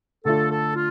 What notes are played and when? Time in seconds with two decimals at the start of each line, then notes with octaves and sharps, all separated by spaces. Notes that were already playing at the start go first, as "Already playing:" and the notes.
0.24 D3 A3 D4 F4 A4
0.50 A4
0.75 F4